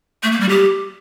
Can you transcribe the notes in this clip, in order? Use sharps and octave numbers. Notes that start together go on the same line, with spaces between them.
A3
A#3
G3
G4